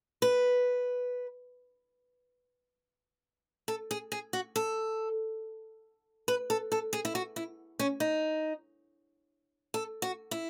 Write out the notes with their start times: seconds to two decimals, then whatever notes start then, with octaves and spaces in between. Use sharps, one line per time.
0.22 B4
3.68 A4
3.91 G#4
4.12 G#4
4.33 F#4
4.56 A4
6.28 B4
6.50 A4
6.72 A4
6.93 G#4
7.05 E4
7.15 F#4
7.36 E4
7.79 C#4
8.00 D#4
9.74 A4
10.02 F#4
10.31 E4